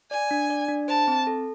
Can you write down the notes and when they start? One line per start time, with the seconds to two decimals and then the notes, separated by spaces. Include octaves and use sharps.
0.11 D5 G#5
0.31 D4
0.50 D5
0.69 D4
0.88 C5 A5
1.08 C4
1.27 A4